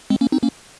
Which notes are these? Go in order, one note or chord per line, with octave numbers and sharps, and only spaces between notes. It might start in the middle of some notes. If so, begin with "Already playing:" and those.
G#3 C4
A#3 C#4
C4 D#4
A#3 C#4